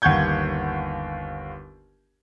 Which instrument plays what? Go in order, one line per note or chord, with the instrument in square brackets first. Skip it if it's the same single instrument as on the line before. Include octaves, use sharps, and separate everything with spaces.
[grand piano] G1 D#2 F#5 C#6 G6 G#6